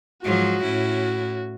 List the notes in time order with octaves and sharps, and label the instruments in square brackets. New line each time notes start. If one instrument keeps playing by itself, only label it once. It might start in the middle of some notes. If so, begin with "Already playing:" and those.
[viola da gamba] G#2 F3 F#3 [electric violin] F#4
[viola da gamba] A2 C#4 E4